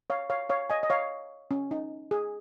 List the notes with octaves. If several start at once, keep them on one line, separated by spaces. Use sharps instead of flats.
C#5 F5
C#5 F5
C#5 F5
D#5 G#5
D#5
C#5 F5
C#4
D#4
G#4